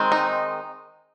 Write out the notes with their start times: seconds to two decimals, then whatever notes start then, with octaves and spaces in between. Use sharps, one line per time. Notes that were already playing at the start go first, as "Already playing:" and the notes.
Already playing: D#3 G#3 C4
0.12 D#4